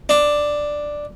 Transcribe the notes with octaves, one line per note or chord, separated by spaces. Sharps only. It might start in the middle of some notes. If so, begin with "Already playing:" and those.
D4